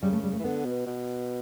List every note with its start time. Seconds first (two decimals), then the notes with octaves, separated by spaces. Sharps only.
0.02 C#3 G3
0.13 A3
0.23 G3
0.33 A3
0.40 E3
0.44 D3 B3
0.65 B2
0.87 B2